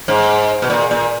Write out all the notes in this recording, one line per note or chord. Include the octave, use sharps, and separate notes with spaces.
G#2
B2
A#2
A#2